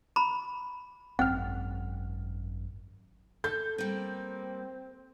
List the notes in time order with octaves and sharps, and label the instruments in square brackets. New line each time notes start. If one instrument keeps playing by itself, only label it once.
[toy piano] A#5 B5
[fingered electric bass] G#1 F#2 [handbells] C4 F6 [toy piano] F#5
[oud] A4 [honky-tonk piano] G6
[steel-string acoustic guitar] G3 A#3 [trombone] C4